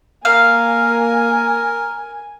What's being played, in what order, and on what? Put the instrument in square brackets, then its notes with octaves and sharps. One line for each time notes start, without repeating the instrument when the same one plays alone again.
[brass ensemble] A#3 [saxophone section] A#4 [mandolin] F5 [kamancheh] G#5